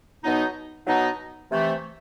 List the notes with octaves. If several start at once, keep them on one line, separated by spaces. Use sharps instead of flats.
B2 F#3 B3 D#4
B2 F#3 B3 D#4
C3 E3 A3